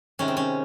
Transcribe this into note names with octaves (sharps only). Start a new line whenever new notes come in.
C3 D#3 G#3 C#4
C4
C#4